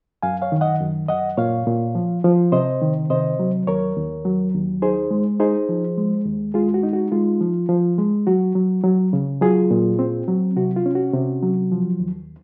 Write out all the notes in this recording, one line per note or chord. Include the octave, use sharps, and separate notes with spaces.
F#2 F5 G#5
C#5 F5
D#3
D#5 F#5
F#2
F#2 D#5 F#5
A#2 C#5 F5
A#2
F3
F3
C3 C5 D#5
D#3
C3 C5 D#5
F#3
D#2 A#4 C#5
D#2
F#3
D#2
D#4 G#4 C5
G#3
D#4 G#4 C5
F3
G#3
D#2
G#3 F4 G#4
F#4
D#4
F#4
G#3 F4
F3
F3
G#3
F#3 F#4
F#3
F#3
C#3
F#3 F4 G#4
A#2
C4
F#3
C3 F#4
F4
C#4
F#4
C3
F#3
F3
D#2